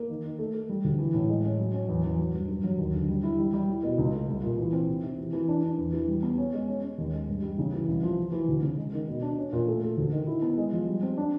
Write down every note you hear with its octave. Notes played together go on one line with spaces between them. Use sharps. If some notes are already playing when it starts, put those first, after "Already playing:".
Already playing: A#3
D#3
D#3
A3
A3
G3
D2
E3
A2
G#3
C#4
F#3
C#4
E2
E2
F#3
G2
G2
F#3
D#2
D3
G3
E4
G3
G3
E4
B2
C#2
A3
C2
A#2
E3
C4
C3
C3
E3
E3
D4
D4
E2
E3
G3
B3
C#4
G#3
C#4
C#4
D#2
G#3
G2
G3
C#3
E3
C2
F3
E3
E3
D2
C#3
G#3
D#3
B2
D4
C#4
A#2
A3
A3
D2
D#3
E4
B3
G#3
F3
G3
C4
D4